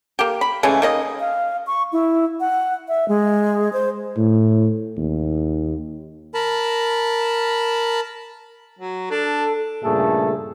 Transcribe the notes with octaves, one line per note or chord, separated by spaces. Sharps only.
A#3 G4
B5
C#3 E3 G#3 A3
D#3 A#3 D#5
F5
C#6
E4
F#5
E5
G#3
C5
A2
D#2
A#4 A5 B5
F#3
D4 A4
G2 A#2 C#3 A3 G#4 A4